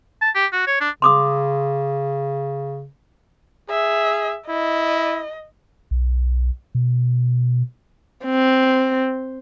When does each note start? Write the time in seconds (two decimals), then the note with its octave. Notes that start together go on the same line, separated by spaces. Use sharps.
0.22 A5
0.35 G4
0.53 F#4
0.67 C#5
0.81 D4
1.02 C#3 C6 D6 D#6
3.70 G#4 E5
4.49 E4 D#5
5.91 B1
6.75 B2
8.25 C4